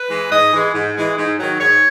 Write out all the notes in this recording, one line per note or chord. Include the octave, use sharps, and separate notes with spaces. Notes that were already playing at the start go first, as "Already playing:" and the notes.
Already playing: B4
E3 G#3
G#2 D#5
E3 G#3
G#2
E3 G#3
G#2
D#3 F#3
G#2 C#5